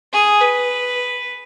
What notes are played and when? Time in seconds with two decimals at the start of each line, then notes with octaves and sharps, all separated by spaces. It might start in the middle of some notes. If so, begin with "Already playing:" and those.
0.13 G#4
0.41 B4